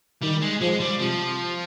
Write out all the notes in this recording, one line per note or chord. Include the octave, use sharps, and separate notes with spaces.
D#3 G3
G#3
F3 G#3
G3
C3 F3